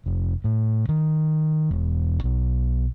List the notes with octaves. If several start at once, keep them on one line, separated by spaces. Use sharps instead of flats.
F1
A2
D#3
E1
B1